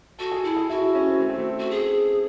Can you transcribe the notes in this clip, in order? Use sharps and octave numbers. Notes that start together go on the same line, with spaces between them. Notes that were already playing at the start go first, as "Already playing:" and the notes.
F#4 A4
G#4
E4 A4
G#4
E4 F#4
E4
C#4
C4
A3
C4
A3
F#4
G#4